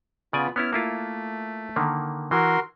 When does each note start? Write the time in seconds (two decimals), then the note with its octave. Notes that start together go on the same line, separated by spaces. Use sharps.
0.33 C#3 B3 F4 D5 G#5
0.56 B3 C#4 E4 F6
0.73 A3 A#3 E4 F4
1.76 D3 D#3 A#3
2.31 E3 F#4 A#4 C6